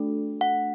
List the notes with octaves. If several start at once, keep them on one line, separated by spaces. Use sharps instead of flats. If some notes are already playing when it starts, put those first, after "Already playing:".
Already playing: A3 D4 F#4 A4
F#5